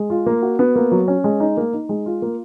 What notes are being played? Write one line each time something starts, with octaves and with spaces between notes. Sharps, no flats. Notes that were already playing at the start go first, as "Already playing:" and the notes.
Already playing: G#3
F4
A#3
F#4
B3
A#3
F#3
C#4
G#3
D#4
A#3
D#4
G#3
F4
A#3